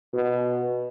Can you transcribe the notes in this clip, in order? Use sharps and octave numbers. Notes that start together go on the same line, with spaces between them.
B2